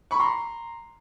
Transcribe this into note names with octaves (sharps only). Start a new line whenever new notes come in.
B5 C#6
A#5 C6